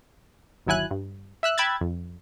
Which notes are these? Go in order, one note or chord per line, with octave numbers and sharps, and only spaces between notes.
G1 D#2 F#3 E4 G#5 F#6
G2
E5 E6 F#6
G5 B5 E6 F#6 G#6 A6
F2